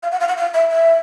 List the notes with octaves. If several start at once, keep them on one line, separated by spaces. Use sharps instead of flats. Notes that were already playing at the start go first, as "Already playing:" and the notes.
F5
F#5
F5
F#5
F5
E5
E5